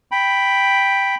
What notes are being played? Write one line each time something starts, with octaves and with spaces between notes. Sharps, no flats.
G5 B5